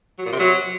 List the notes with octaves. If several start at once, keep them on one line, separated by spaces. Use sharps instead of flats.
F#3
A#2
C3
F#3